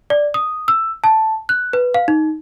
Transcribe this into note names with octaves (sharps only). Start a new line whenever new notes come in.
D5
D#6
E6
A5
F#6
B4
F5
D#4